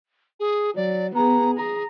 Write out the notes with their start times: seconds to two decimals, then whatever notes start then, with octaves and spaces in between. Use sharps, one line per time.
0.40 G#4
0.76 F#3 D5
1.15 B3 G#4 A#5
1.57 G#4 A#5